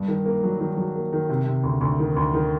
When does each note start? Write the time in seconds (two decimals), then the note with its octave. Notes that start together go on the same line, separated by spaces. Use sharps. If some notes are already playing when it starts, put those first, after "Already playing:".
Already playing: G2
0.08 D#3
0.26 A#3
0.43 F#3
0.60 D#3
0.77 F#3
0.95 A#3
1.13 D#3
1.29 C3
1.46 C3
1.63 D2
1.81 D2
1.99 D#3
2.16 D2
2.34 D#3